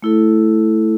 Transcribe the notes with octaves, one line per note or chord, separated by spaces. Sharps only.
A3 E4 A4